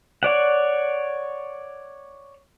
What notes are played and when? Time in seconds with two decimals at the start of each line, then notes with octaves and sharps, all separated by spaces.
0.23 C#5 D5 F#5